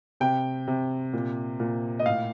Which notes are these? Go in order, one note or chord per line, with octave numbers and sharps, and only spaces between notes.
C3 G5
C3
A#2
A#2
D#5
A2 F5